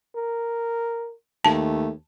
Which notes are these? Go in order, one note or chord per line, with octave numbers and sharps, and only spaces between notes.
A#4
D#2 A3 A5